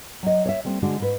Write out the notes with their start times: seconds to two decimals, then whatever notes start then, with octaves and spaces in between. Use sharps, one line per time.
0.23 F#3 D#5
0.45 C#5 D5 E5
0.65 G3 A3 C4
0.82 D3 G#3 D4 F#4
0.99 G#2 B4